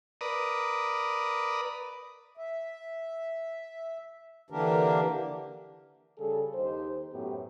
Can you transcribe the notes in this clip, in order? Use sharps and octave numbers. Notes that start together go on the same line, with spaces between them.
A#4 B4 D5 D#6
E5
D3 E3 A#3 D4 G4 A#4
C#3 G3 G#4 A4
D#2 D#4 G4 C5
F#2 A2 B3 G4